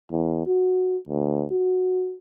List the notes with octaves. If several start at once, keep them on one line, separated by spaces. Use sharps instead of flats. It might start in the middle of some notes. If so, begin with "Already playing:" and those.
E2
F#4
D2
F#4